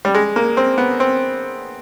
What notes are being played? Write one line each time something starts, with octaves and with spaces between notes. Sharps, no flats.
G3
G#3
A#3
C4
B3
C4